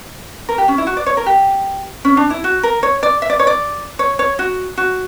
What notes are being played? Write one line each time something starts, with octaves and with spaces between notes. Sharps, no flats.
A#4
G4
C#4
E4
F#4
D5
C#5
A#4
G4
C#4
D4
E4
F#4
A#4
C#5
D5
E5
D5
C#5
D5
C#5
C#5
F#4
F#4